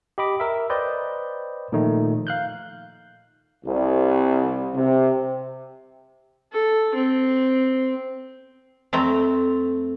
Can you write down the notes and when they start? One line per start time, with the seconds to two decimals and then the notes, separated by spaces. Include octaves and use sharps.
0.18 G4 D#5 B5 D6
0.40 A#4 E5
0.70 B4 C5 D5 D#5 G5 G6
1.72 A#2 D#3 F3 A3 D#4
2.27 F5 F#6 G6
3.65 C2
4.74 C3
6.53 A4
6.95 C4
8.93 F2 A3 C4 A#5